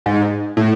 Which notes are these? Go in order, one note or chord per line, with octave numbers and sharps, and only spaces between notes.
G#2
A2